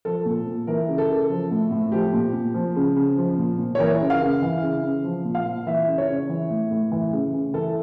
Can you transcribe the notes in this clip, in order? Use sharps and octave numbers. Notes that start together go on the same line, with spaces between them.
F3 A4
A#2
A#2
E3 A#4
C#3
A4
C#3
F3
A2
A2
F3 G4
A#2
A#2
F3
C#3
C#3
F3
A#2
A#2
C#5
E3 A#4
C#3
F5
C#3
E3
C#3
C#3
F3
A#2
F5
A#2
E3 E5
C#3
C#5
C#3
E3
A2
A2
E3
C#3
C#3
E3 A4